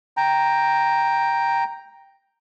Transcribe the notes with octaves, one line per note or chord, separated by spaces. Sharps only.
G5 A#5